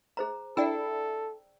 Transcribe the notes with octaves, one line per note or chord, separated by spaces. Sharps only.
G#4 C5 A#5
D4 E4 A4 D5 G5 E6